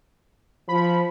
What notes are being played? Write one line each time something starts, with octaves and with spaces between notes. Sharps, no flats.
F3 B5